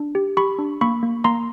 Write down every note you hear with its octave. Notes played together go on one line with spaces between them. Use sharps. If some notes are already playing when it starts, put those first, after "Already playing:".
Already playing: D4
G4
G4 B5 C#6
D4
A#3 B5 C#6
A#3
A#3 A#5 C6